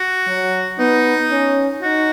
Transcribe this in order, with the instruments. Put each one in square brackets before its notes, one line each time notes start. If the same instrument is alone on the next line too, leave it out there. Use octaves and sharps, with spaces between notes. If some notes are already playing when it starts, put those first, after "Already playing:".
Already playing: [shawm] F#4
[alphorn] F#3
[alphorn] B3 [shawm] D#4
[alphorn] C#4
[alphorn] D#4 [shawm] F#4